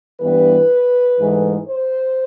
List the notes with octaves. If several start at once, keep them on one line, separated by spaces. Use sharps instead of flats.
G2 E3 G3 B3 B4
G#2 E3 A3
C5